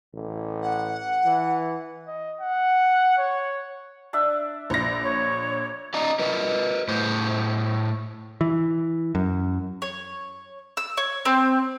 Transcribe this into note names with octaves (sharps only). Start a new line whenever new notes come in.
A1
F#5
E3
D#5
F#5
C#5
D4 D5 E5
A#1 A#6
C#5
D5 D#5 A#5
A#4 B4 D#5
A2 C5
E3
F#2
C#5
E6
C#5
C4